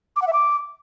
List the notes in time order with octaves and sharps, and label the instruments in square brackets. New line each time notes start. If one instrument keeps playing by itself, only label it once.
[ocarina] D6
F#5
E5
D6